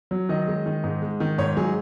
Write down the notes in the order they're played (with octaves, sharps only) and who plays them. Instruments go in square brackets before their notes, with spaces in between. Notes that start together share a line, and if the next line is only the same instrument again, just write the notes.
[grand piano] F#3
D#3 D#5
G#3
D#3
G#2
G#3
D#3
G#2 C#5
F#3 G#4